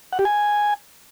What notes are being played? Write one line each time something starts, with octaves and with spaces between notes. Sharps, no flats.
F#5
G4
G#5